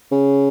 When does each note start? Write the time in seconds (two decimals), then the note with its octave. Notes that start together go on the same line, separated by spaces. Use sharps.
0.11 C#3